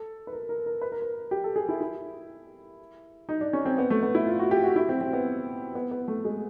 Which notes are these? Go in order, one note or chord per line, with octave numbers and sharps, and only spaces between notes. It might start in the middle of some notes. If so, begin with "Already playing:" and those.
Already playing: A4
B4
A#4
A#4
A#4
B4
A#4
B4
G4
A4
G#4
E4
E4
D#4
D4
C#4
C4
B3
A3
B3
E4
F4
F#4
G4
F#4
E4
C4
C4
B3
B3
B3
A3
G#3